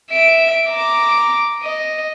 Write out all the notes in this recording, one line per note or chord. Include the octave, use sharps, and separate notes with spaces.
E5 D7
A#5 D6
D#5